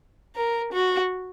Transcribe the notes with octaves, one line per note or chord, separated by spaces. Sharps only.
A#4
F#4